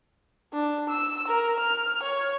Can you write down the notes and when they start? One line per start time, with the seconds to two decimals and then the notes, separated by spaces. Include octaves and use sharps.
0.53 D4
0.89 E6
1.28 A#4
1.60 F6
2.03 C#5